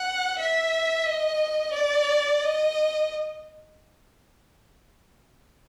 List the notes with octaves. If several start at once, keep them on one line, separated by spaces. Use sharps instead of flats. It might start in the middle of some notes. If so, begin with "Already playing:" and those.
Already playing: F#5
E5
D#5
D5
D#5